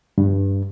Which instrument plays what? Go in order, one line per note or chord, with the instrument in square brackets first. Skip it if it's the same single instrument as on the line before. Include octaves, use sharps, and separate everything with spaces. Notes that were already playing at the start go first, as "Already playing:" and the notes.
[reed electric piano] G2